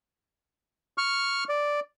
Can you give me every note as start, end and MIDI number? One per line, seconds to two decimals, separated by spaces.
0.98 1.44 85
0.98 1.44 89
1.49 1.80 74